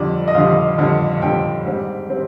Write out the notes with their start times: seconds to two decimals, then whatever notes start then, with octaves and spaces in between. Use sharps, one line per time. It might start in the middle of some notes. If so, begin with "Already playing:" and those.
Already playing: F2 D3 G3 D5
0.28 D#5
0.35 F2 D3 G3 F5
0.78 F2 D3 G3
1.22 F2 D3 G3 G5
1.66 G#2 G3 C4
2.10 G3 C4